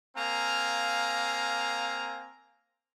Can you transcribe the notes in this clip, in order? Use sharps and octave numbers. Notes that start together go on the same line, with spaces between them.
A#3 C4 F5 G#5 A#5